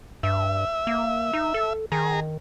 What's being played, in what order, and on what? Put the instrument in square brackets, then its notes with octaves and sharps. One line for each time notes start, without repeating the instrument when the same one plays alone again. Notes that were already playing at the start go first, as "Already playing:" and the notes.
[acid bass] G2 [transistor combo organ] E5
[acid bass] A#3
D#4
A4
[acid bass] D#3 [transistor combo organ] G#4 A#5